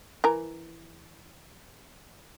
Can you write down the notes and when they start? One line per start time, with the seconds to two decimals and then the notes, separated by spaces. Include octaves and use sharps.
0.24 E3 A#4 A#5